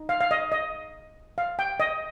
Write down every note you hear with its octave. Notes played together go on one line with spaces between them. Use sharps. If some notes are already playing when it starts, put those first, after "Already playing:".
Already playing: D#4
F5
F5
D#5
D#5
F5
G5
D#5